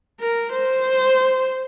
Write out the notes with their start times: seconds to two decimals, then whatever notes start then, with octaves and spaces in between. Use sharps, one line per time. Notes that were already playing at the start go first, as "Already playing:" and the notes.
0.20 A#4
0.53 C5